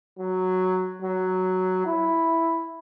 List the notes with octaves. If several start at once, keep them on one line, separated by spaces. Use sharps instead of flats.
F#3
F#3
E4